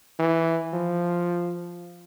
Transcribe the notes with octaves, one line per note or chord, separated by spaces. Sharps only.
E3
F3